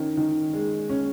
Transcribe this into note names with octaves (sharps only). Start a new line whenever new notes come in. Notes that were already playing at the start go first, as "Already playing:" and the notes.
Already playing: D#3 C#4
D#3
G#3
C#4